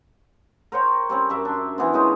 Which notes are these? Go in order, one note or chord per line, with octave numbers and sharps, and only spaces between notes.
A#4 C5 C#5 G5
G3 C4 C#4
F#2 A#4 E5 D6
D4 C6
E3 B3 C4
G#3 C#4 D#4 F4